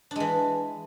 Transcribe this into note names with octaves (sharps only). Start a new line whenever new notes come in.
E3 G#3 D4